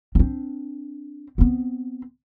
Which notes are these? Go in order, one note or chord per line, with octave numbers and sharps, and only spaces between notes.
C4 D4
B3 C4